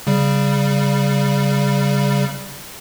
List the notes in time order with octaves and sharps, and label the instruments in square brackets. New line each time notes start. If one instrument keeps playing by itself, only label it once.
[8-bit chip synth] C#3 G3